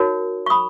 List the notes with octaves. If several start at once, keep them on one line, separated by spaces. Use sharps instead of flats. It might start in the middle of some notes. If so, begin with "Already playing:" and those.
Already playing: D#4 F#4 A#4 C#5
C#6
B5 D#6